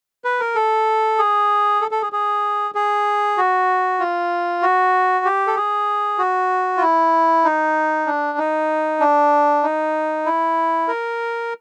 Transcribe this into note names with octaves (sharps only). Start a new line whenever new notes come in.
B4
A#4
A4
G#4
A4
A4
G#4
G#4
G#4
F#4
F4
F#4
G4
A4
G#4
F#4
F4
E4
D#4
D4
D#4
D4
D#4
E4
A#4